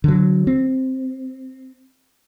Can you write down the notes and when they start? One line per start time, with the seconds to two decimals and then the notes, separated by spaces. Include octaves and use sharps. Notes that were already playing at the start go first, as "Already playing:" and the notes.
0.04 D3 F#3
0.47 C4